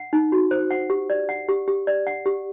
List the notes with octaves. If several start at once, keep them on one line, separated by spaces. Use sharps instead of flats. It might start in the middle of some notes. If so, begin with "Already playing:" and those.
Already playing: F#5
D#4
F#4
C5
F#5
G4
D5
F#5
G4
G4
D5
F#5
G4